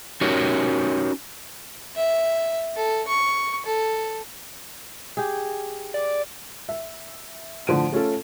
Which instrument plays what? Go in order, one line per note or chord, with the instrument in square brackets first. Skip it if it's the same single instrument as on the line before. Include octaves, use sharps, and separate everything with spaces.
[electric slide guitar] C#4 D#4 F#4 G4 A#4 C#5
[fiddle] E5
A4
C#6
A4
[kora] G4 G#4
[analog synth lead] D5
[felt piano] E5
A2 D3 F3 D7 D#7
A3 C#4 F4 A4